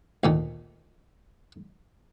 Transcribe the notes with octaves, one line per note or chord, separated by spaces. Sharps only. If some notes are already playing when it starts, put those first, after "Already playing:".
D2 A#2 D#3